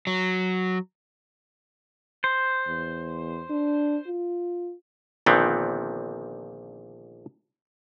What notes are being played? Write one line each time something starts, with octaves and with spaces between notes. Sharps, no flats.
F#3
C5
E2
D4
F4
A#1 A#2 D3 D#3 B3 C4